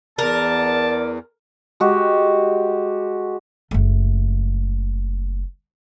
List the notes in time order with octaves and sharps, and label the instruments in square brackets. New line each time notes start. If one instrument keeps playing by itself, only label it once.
[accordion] E2 [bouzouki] A#4 [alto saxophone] D5 [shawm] A5
[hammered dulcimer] G#3 F#4 G4
[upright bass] F#1 A3